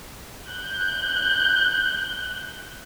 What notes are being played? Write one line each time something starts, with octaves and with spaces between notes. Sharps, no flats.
F#6 G6